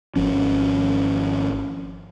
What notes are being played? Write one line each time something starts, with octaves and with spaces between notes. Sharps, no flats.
G#1 F3 C#4